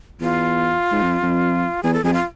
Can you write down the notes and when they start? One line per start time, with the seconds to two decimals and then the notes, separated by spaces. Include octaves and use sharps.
0.20 E2 F4
0.91 G#2
1.02 F2
1.22 F2
1.83 E2 G#4
1.93 A4
2.04 F2 G#4
2.13 F4